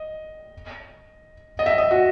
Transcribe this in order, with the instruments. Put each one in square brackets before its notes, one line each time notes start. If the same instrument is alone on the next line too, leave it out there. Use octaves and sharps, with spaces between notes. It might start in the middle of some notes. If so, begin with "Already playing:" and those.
Already playing: [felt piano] D#5
D#5
E5
D#5
F#4